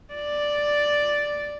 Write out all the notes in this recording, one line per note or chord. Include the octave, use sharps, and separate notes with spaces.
D5